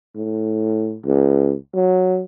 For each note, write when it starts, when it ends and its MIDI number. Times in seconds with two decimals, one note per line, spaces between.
0.16 0.97 45
1.06 1.54 37
1.75 2.23 54